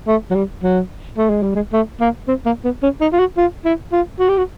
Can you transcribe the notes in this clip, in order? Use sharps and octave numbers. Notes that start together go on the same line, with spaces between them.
A3
F#3
G3
F#3
A3
G#3
G3
G#3
A3
A#3
C4
A#3
B3
C#4
D#4
F4
F#4
F4
E4
F4
F#4
G4
F#4